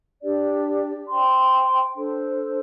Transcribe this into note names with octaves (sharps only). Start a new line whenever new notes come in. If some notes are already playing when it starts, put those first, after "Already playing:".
D4 G4 D5
C5 G5 C6
D4 A4 C5